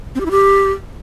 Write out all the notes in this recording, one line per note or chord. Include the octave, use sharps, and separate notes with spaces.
C4
G4
E4
G4